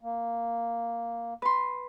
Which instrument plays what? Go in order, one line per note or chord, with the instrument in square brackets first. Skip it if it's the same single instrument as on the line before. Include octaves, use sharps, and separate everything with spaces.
[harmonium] A#3
[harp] B4 C6